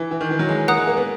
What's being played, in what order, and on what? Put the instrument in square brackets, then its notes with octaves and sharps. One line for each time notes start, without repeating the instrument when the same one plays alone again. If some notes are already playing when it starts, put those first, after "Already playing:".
Already playing: [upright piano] E3
E3
D#3
E3
F#3
G#3
[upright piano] A#3 [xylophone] F#5 A#5 D#6 F#6
[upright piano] G#3
A#3
B3